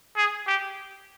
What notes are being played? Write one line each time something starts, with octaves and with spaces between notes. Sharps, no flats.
G#4
G4